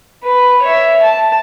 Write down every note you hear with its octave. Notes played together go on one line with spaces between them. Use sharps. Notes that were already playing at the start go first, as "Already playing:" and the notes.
B4
C#5 E5
A5